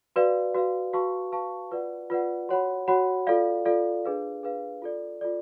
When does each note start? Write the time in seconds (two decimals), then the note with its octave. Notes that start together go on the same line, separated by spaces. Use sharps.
0.16 F#4 B4 D5 F5
0.54 F#4 B4 D5 F5
0.93 F#4 B4 F5 A5 C#6
1.32 F#4 B4 F5 A5 C#6
1.71 F4 B4 D5 F#5
2.10 F4 B4 D5 F#5
2.49 F#4 C#5 F#5 B5
2.88 F#4 C#5 F#5 B5
3.27 F4 A4 D5 F5
3.65 F4 A4 D5 F5
4.04 D4 G#4 B4 F5
4.43 D4 G#4 B4 F5
4.82 F4 A4 D5
5.21 F4 A4 D5